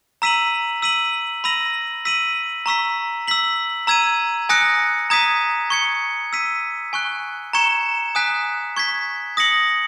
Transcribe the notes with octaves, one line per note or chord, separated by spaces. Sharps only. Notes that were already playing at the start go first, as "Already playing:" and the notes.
A#5 E6 B6 D#7 F#7
E6 B6 D#7 F#7
B5 E6 A#6 D#7 F#7
E6 B6 D#7 F#7
A#5 C#6 E6 B6
E6 B6 F#7
A#5 E6 G#6 D#7
G#5 D#6 F#6 A#6 C#7
A#5 D#6 G#6 B6 D#7
C#6 G#6 C#7
E6 B6 D#7
G#5 C#6 F#6
A#5 C#6 G#6 C#7 E7
G#5 D#6 F#6 B6
C#6 G#6 B6
D#6 A#6 C#7 F#7